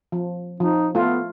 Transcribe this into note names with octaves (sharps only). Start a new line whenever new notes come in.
F3
F3 D#4
A3 B3 F4